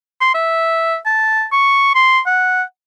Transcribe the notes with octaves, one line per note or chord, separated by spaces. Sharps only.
C6
E5
A5
C#6
C6
F#5